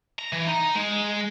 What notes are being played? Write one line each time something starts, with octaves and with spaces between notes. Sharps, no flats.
A#5
E3
D#4
G#3